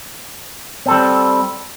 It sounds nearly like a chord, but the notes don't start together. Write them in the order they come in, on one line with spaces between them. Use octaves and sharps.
C4 A4 G3